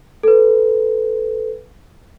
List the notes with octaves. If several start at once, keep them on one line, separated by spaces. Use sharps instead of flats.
A4 B4